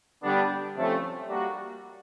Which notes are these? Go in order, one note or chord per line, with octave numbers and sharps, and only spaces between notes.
D3 G3 B3 D4
C3 F3 A3 C#4
G3 A#3 D4 F#4